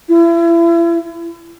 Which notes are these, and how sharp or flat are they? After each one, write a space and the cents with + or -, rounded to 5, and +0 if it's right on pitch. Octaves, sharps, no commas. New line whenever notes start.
E4 +35